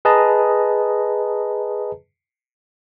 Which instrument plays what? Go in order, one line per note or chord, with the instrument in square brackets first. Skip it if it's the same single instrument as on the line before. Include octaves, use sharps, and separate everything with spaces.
[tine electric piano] G#4 B4 D#5 A5 A#5